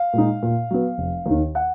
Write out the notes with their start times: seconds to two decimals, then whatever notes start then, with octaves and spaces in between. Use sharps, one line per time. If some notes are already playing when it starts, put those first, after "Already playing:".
Already playing: F5
0.13 A#2 G#3 D#4
0.43 A#2
0.71 F#3 B3
0.98 F1
1.26 D#2 D#3
1.55 F#5